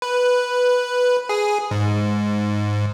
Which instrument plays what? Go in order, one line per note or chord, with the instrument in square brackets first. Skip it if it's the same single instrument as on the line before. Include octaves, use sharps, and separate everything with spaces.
[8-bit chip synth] B4
G#4
G#2